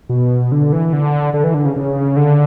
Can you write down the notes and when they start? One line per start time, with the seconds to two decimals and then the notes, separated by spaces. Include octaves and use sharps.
0.09 B2
0.52 D3
0.73 E3
0.93 D3
1.34 D3
1.44 E3
1.54 D3
1.65 C#3
1.76 C#3
2.17 D3